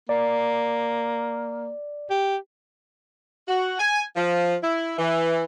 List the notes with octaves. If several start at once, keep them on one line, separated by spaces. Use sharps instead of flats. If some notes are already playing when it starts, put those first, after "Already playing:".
A#3 D5
G4
F#4
G#5
F3
E4
E3